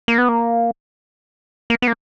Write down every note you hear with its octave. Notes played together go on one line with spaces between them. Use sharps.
A#3
B3
A#3
A#3
B3
A#3